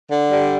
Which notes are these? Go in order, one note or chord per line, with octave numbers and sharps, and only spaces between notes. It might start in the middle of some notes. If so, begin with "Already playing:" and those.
D3
G3